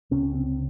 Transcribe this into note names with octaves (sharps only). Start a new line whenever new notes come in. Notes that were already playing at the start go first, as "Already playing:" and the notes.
C#2 C3 C#4
C4